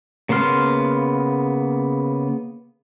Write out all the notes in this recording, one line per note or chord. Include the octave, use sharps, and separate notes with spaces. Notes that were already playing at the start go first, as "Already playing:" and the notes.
C#3 A#3 B3 C6 F6